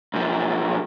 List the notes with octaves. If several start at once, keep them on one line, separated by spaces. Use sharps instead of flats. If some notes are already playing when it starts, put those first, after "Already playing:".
B1 F3